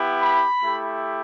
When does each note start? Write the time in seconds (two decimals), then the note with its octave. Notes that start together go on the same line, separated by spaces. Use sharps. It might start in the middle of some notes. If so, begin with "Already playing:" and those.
Already playing: B3 E4 G4
0.21 B5
0.63 A3 E4 G4